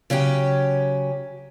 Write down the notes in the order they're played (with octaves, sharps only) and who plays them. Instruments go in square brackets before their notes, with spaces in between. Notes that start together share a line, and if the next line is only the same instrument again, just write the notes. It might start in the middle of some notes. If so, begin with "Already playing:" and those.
[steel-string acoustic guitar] C#3 F#3 C#4 G4